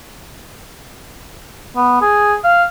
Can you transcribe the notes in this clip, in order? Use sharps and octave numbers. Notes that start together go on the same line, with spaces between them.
B3
G#4
F5